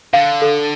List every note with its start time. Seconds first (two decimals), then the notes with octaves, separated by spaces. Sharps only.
0.13 D3 F5
0.42 A4